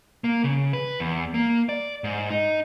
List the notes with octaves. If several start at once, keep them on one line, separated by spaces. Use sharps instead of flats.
A#3
C#3
B4
E2
A#3
D5
G#2
D#4